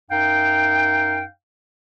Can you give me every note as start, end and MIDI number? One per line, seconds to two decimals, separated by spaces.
0.10 1.25 42
0.10 1.25 63
0.10 1.25 77
0.10 1.25 79